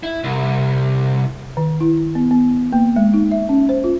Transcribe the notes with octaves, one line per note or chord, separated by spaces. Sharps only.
E4
C2
D#3
E4
B3
B3
A#3
G#3
D#4
E5
C#4
C5
F4